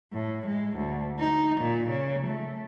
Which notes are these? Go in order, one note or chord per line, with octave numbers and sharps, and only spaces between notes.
A2
G#3
D2
D#4
A#2
C#3
A3